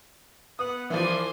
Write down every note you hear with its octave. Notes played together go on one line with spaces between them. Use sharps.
B3 F#5 D#6
C2 E3 F3 C5 D5 G#5